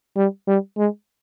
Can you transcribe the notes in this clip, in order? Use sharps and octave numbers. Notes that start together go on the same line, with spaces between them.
G3
G3
G#3